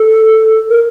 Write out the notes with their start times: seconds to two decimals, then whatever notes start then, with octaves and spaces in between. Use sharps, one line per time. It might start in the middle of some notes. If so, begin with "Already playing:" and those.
Already playing: A4
0.70 A#4